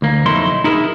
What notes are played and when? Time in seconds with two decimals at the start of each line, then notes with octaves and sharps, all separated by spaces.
0.02 D2 A#3
0.26 B1 F2 F#3 D#4 E4 C6
0.64 D#4 E4 G#4 A#4